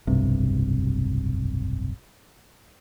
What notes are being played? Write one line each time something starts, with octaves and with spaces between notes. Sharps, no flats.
F1 B1 G2 C3